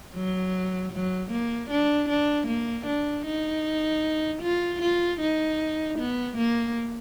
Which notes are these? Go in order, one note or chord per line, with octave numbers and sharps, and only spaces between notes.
F#3
F#3
A#3
D4
D4
A#3
D4
D#4
F4
F4
D#4
B3
A#3